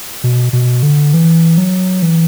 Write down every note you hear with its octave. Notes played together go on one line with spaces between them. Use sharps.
B2
B2
D3
E3
F#3
E3